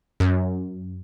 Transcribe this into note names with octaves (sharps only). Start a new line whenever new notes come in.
F#2